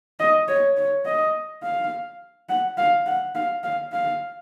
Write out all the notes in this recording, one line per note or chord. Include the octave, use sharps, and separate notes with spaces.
D#5
C#5
C#5
D#5
F5
F#5
F5
F#5
F5
F5
F5